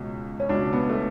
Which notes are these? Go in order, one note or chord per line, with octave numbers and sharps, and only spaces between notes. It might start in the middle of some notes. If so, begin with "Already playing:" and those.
Already playing: C#2 B2
C#4
C#2 B2 D4
B3
A3